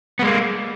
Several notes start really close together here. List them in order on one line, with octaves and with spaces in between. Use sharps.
B3 G#3 A#3